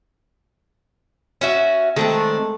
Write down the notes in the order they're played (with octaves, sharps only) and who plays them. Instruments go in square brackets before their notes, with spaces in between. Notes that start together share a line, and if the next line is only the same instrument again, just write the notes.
[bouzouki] C#4 F#4 E5
[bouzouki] D#3 C4 D4 [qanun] G#3 A3